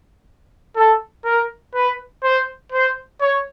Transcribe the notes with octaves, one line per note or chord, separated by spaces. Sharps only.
A4
A#4
B4
C5
C5
C#5